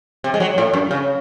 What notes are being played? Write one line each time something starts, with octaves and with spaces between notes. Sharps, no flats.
C3
G#3
F#3
A2
F#2
C#3